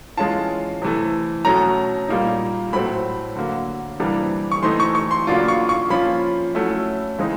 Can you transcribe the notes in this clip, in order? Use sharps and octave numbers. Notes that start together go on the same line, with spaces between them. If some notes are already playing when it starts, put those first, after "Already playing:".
E3 G#3 C#4 F4 A5
C3 E3 A3
B2 F#3 A3 C#4 A#5
A#2 G3 A#3 D#4
A2 F#3 A3 C4 B5
D3 F#3 A#3
C3 E3 G3 A#3 D4
C#6
E3 A3 C4 D#4 C6
C#6
C#6
C6
C#3 F#3 A#3 D4 F4
C#6
C#6
F3 A#3 C#4 F4 B5
F#3 A3 C#4 E4
C#3 E3 G#3 C4 D#4